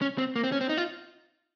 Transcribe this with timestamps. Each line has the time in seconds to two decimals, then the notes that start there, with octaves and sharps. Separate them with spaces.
0.01 C#4
0.18 C4
0.36 A#3
0.44 C4
0.52 C#4
0.61 C4
0.69 D#4
0.77 F4